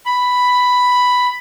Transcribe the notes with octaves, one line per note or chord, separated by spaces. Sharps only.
B5